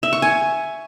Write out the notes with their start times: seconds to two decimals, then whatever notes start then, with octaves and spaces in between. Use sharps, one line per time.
0.03 E5
0.13 C#6
0.22 G#5